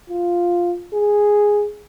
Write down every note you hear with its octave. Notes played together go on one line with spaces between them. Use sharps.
F4
G#4